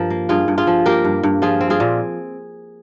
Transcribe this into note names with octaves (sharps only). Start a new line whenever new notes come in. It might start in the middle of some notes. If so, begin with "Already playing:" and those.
Already playing: G2 F3 A#4
A#3
G2 F4 G#4
G2
F4 G#4
F3
A#3 G4 A#4
G2
G2
F3 F4 G#4
C4
F4 G#4
A#2